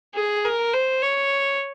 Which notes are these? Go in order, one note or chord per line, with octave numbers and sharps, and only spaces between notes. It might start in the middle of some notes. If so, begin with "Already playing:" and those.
G#4
A#4
C5
C#5